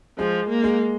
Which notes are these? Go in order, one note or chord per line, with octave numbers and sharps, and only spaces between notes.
F3 G#3
A#3
G#3